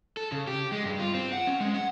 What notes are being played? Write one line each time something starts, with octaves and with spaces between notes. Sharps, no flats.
A4
C#3
G4
G#3
G2
F4
C4
F#5
C#4
G#3
F#5